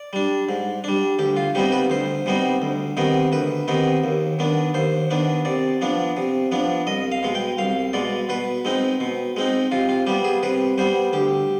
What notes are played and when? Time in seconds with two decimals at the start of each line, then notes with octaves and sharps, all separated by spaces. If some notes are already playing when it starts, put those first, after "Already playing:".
Already playing: D5
0.13 G3 D4
0.49 G#2
0.84 G3 D4
1.19 D2 G4
1.37 F4
1.55 C3 G3 B3 D#4 G4
1.72 B4
1.90 D2 C5
2.26 C3 G3 B3 D#4
2.62 D2
2.97 C3 D#3 B3 D#4
3.32 D2 B4
3.68 C3 D#3 B3 D#4
4.04 D#2
4.39 D#3 B3 D4
4.74 D#2 C5
5.10 D#3 B3 D4
5.45 C3 D5
5.81 F3 B3 D4
6.17 C3
6.51 F3 B3 D4
6.87 C2 D#5
7.12 F5
7.23 B2 G#3
7.35 G5
7.58 C2 F5
7.93 B2 G#3 D5
8.29 B2 B4
8.65 G#3 C4 D#4
9.00 B2
9.36 G#3 C4 D#4
9.72 C3 F4
9.89 F4
10.07 G3 B3 G4
10.24 G#4
10.43 C3 B4
10.78 G3 B3 C5
11.13 D2 G4